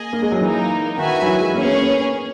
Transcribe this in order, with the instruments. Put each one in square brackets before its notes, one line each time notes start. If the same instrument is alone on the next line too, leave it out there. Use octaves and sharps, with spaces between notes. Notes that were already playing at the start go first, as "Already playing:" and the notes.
Already playing: [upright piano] A#3 [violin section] G#4 D#5 G#5
[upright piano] A#3
G#3
F#3
[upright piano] E3 [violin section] A#3 D#4 A#4
[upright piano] D#3 [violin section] F#4 B4 E5 G#5
[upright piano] F#3
E3
G#3
[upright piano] A#3 [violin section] C#4 G#4 C#5
[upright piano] B3
A#3
B3
C#4